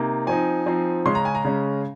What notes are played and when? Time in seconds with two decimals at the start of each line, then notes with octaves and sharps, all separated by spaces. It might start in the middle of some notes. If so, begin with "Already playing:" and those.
Already playing: C3 A#3 D#4
0.27 F3 C4 D#4 G#5
0.66 F3 C4 D#4
1.06 C#3 G#3 C#4 C6
1.15 A#5
1.25 G#5
1.35 A#5
1.45 C#3 G#3 C#4